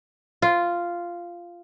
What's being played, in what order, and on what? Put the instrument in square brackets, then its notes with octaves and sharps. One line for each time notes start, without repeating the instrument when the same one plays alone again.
[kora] F4